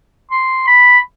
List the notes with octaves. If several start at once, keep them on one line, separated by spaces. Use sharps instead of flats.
C6
B5